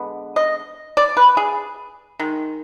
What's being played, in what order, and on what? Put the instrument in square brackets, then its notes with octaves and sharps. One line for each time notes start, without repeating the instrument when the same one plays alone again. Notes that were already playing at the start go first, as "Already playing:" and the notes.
Already playing: [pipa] D3 G#3 B3
D#5
D5
B4
G#4
D#3 G#3